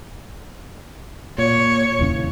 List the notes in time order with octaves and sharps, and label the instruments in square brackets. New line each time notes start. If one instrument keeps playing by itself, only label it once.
[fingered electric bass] A#2 [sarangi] C#5
[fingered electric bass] D#1 E2 C#3